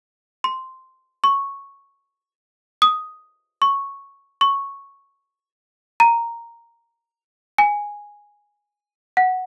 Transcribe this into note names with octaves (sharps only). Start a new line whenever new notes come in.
C6
C#6
D#6
C#6
C#6
A#5
G#5
F#5